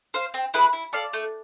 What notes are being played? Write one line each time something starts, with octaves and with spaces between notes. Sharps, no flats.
C5 F5
C4
E4 G#4 B4
E4
A4 D5 F5
A3